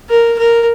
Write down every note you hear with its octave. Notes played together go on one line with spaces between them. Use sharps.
A#4
A#4